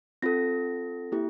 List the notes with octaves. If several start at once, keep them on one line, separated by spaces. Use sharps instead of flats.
C4 F4 A4 A#6
A#3 E4 G4